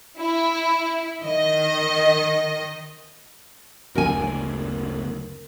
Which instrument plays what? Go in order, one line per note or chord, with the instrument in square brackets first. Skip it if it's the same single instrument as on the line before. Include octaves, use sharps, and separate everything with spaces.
[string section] E4
D#3 D#5
[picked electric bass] F#1 D2 [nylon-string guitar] A#4 G#5